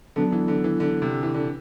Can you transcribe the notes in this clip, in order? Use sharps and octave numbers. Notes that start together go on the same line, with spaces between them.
D3 F#3 B3 D4 A4
E3
D3
E3
D3
C3
E3
D3